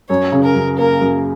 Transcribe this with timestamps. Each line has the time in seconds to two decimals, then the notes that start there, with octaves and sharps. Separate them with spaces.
0.09 F#2 C#5
0.32 C#3
0.44 A#4
0.55 F#2
0.78 A#3 A#4
1.01 F#2